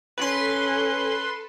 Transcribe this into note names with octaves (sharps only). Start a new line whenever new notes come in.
C#4 A4 B4 C6